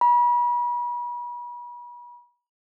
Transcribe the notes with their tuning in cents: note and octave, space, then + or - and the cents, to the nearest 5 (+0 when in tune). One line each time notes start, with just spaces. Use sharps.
B5 -35